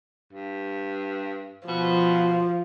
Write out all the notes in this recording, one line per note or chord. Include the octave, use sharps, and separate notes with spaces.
G2
B2 F3